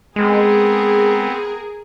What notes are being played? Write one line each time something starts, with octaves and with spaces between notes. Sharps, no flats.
G#3 B3 C4 G#4 A#4